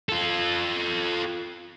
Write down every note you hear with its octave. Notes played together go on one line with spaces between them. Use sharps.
F4 A4